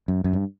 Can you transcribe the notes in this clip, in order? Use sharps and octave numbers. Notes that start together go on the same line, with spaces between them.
F#2
F#2
G2